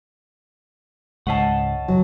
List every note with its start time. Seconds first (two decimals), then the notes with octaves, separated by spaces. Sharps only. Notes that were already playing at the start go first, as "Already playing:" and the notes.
1.27 C#2 G#2 C#5 D#5 F#5 A5
1.88 F#1 F#3